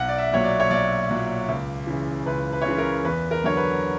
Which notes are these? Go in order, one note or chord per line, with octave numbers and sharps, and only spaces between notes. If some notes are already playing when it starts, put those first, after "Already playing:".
Already playing: B1 F#5
D5
E5
A#2 F#3 C#5
D5
C#5
B1 D5
A#2 F#3
C#2
C#3 E3
C#2 B4
B4
C#5
C#3 E3 B4
A#4
E2 B4
A#4
D3 F#3 C#5
B4